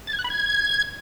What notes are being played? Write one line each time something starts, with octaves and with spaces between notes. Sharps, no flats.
A6
G#6
F#6
B5
G#6